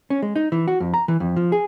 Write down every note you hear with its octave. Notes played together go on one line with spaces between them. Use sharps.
C#4
G#3
D#4
E3
F#4
F2
A#5
E3
F2
F3
G#4